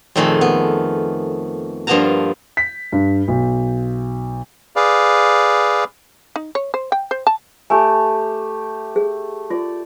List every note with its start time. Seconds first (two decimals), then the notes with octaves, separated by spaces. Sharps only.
0.16 F2 A#2 D#3 A3 G#4 B5
0.41 B3
1.87 G2 F3 A#3 B3 A5 A#5
2.57 B6
2.92 G2
3.28 B1
4.76 G#4 B4 D5 F5
6.36 D#4
6.55 C#5
6.74 C5
6.92 G5
7.11 C5
7.27 A5
7.70 A3 G4 G#5
8.96 G#4
9.50 F4 D5